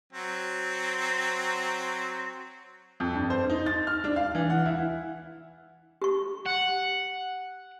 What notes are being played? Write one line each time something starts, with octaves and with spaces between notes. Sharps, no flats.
F#3 C4
F2
G2
C5
D#4
A6
F6
D4
F5
E3
F#5
E4
G4 C#6
F#5